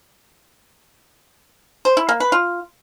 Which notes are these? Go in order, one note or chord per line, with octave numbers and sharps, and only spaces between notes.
C5
E4
A#3
B4
F4